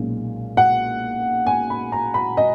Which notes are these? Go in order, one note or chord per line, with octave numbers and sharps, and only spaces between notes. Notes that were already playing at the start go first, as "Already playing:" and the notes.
Already playing: B1 A#2 G#3 C#4
F#5
G#5
B5
A#5
B5
D#5